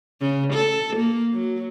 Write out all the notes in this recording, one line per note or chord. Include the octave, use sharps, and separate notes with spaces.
C#3
A4
A#3
F#3